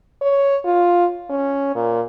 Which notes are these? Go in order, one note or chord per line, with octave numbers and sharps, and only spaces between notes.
C#5
F4
C#4
A#2